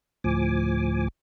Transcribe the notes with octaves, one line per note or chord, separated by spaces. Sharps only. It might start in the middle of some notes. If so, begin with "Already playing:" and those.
D2 A2 F3 G#5 D6